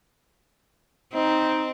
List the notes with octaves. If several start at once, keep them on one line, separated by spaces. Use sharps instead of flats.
C4 D#4